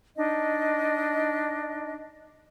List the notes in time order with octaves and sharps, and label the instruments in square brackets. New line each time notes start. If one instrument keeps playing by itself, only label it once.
[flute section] D4 D#4 D#5